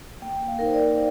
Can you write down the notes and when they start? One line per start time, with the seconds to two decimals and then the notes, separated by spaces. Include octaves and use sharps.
0.22 A#3 G5
0.48 F5
0.59 D#4 A#4
0.66 C5
0.74 D5